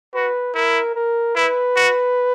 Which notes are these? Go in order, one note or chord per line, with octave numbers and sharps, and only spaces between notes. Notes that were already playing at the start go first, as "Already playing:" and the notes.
F#4 B4
E4 A#4
A#4
E4 B4
F#4